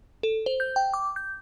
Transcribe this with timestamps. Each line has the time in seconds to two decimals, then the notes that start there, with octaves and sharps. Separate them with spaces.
0.23 A4
0.46 C5
0.60 G6
0.76 G5
0.94 D6
1.16 G6